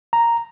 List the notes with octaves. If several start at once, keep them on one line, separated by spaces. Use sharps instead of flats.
A#5